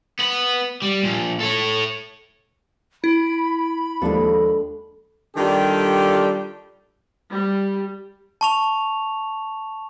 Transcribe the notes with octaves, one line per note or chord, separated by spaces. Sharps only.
B3 B5
G3
A#2 F3
A4 C#5
E4 B5
D#2 F3 G#3 D4 A4
D#3 G3 D4 F4 G4 A4
G3
A5 C#6 F7